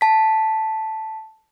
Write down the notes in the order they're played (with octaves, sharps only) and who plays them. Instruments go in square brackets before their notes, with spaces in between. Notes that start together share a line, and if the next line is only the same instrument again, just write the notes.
[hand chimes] A5 B6